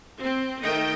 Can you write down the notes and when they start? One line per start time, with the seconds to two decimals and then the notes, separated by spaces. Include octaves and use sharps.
0.20 C4
0.61 D#3 A3 D#5 G5